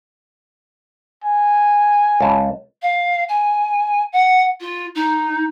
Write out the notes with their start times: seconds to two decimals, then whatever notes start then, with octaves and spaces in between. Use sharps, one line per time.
1.24 G#5
2.20 C#2 A5
2.82 F5
3.29 G#5
4.13 F#5
4.60 F4
4.95 D#4